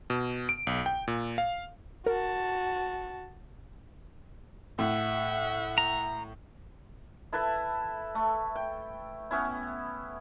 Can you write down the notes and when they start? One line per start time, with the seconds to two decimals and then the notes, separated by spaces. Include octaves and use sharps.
0.10 B2
0.49 D7
0.67 B1
0.86 G5
1.08 A#2
1.38 F5
2.06 F#4 A#4 A5
4.79 A2 E5 F#5
5.78 A#5
7.33 E4 A4 B4 E5
8.15 A3
8.55 G5
9.31 B3 C#4 E4